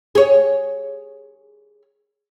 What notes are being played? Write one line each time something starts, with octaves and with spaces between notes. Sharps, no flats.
G#4 C#5